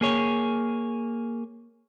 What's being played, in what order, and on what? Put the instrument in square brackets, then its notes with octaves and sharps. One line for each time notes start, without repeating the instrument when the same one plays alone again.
[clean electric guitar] A#3 G#4 C#5